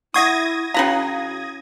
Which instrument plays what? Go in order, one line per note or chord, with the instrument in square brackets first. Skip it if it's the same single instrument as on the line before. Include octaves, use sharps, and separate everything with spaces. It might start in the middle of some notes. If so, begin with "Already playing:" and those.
[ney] E4 [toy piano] E5 F#5 C#6 [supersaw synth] D#6 G#6 A#6
[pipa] C#3 B4 A#5 [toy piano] C#4 E4 F5 [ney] F#4